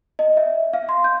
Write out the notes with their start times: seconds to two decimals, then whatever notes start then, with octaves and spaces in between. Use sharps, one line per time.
0.19 D#5
0.37 E5
0.73 F5
0.89 C6
1.04 G6